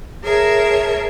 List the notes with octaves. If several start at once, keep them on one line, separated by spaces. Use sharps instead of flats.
G#4 A#4 C#5 E5 A5